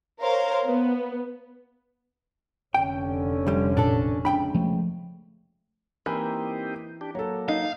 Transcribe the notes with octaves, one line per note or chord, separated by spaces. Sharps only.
A#4 C5 C#5 F5
B3
F1 D3 C#4 G5
D2 G3
A1 A#2 D4 A4
C#2 D4 G5 B5
F3 A3
E3 A#3 C4 D#4 G4
D4 G4
F#3 A#3 A4 C#5
D#4 F5